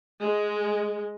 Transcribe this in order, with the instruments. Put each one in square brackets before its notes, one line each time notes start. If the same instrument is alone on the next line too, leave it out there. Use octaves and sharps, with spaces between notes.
[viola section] G#3